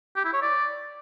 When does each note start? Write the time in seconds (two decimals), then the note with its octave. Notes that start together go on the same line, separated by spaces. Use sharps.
0.16 G4
0.25 E4
0.33 C#5
0.42 D5